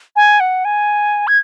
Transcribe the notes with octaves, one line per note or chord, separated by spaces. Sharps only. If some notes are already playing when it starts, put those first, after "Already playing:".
G#5
F#5
G#5
G#6